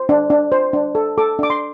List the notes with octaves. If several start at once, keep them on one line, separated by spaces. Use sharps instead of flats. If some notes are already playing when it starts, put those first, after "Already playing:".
Already playing: C5
D4
D4
C5
D4
A4
A4 D6
D4 D6
C6